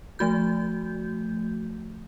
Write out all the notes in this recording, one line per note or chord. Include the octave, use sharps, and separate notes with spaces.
F3 A3 F#4 G6